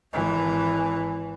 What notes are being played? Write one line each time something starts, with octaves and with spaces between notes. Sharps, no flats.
G#1 E3